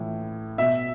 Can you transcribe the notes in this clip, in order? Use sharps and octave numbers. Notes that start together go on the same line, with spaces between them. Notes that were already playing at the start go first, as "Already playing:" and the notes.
Already playing: A2 E3
B2 E5